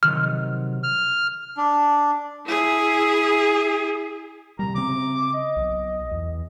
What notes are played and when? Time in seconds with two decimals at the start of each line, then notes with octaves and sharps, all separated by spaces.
0.03 C3 D#3 F#3 F6
0.83 F6
1.57 D4
2.45 E4 G#4
4.59 C3 G3 A#5
4.75 C#3 C4 D6
5.34 D#5
5.56 B1
6.11 E2